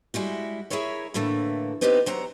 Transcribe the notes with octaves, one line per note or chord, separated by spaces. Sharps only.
G3 G#3 E4 F#4
E4 G#4 A#4 C#5 E5
A2 D3 E3 A3 A#3
B3 C4 D#4 G4 G#4 B4
F#3 C4 F#5 A#5